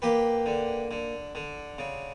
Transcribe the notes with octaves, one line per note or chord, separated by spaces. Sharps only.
A#3 G4 B4
D3
D3
D3
C#3